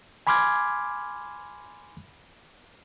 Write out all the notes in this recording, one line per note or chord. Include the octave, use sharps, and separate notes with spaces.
G#5 B5 C6 D6 F6 G#6